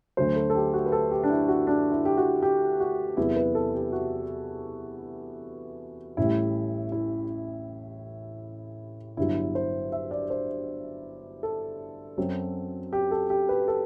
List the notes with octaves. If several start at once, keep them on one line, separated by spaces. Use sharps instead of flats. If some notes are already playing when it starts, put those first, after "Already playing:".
D2 D3 F#3 A3 C5
A4
A4
G4
F#4
B4
A4
G4
D4
E4
F#4
D4
E4
G4
F#4
G4
F#4
E2 C3 F#3 B3 E4
B4
A4
G4
F#4
A1 A2 G3 E4
E4
G1 G2 F#3 E4
C5
E5
D5
C5
A4
F#2 F#3 C4
G4
A4
G4
B4
A4